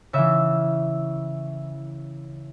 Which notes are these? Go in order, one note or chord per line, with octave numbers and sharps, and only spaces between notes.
C#3 E3 E5